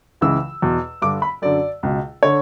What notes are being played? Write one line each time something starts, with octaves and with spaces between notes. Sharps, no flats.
C#2 C#3 E3 E6
E2 B2
G2 D3 D6
B5
F#2 D3 D5
C#2 B2
D3 C#5